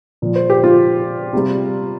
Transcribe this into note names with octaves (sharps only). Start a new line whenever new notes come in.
A#2 F3
C5
G4
F4
C3 G3